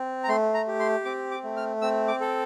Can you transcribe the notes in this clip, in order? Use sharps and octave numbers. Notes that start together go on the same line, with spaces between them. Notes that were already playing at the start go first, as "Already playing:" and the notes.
Already playing: C4
A#5
A3 C6
A#5
G4
C6
C4 D6
D6
A3
F6
C4 E6
D6
A4